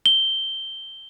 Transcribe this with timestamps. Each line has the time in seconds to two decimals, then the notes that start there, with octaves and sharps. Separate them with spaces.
0.06 G7